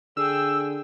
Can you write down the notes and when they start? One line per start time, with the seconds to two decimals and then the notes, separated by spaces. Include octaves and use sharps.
0.17 D3 G#4 G5 E6